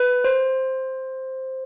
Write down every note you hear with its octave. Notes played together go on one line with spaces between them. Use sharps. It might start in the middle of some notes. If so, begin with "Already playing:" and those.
Already playing: B4
C5